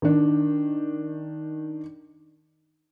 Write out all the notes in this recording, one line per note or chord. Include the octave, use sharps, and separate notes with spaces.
D#3 D4